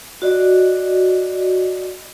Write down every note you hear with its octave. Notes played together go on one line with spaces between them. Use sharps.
F#4 D5 D#5